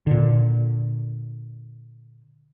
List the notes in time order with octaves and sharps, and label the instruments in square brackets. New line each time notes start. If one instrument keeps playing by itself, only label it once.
[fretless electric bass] A#2 D3